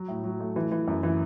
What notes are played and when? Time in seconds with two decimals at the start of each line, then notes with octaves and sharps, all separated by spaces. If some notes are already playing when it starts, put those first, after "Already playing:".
Already playing: F#3
0.08 A2
0.24 F#3
0.40 A3
0.56 E3
0.72 E3
0.88 F#2
1.03 E3